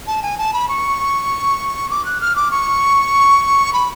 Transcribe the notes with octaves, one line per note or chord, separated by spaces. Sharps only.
A5
G#5
A5
B5
C#6
D6
F#6
F6
D6
C#6
B5